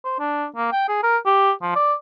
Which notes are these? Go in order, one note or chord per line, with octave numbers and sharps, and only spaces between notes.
C5
D4
A#3
G5
G#4
A#4
G4
F3
D5